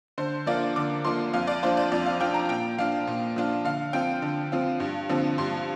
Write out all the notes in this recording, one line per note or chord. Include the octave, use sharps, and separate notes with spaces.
D3 C5
F3 A#3 D4 F4 D5
D3 D6
F3 A#3 D4 F4 C6
F2 F5
D5
F3 D4 F4 C5
D5
F2 D5
F5
F3 D4 F4 G5
A#5
A#2 G5
F3 D4 F4 F5
A#2
F3 D4 F4
D3 F5
F3 C4 F4 G5
D3
F3 C4 F4
G2
D3 F3 C4
G2 C6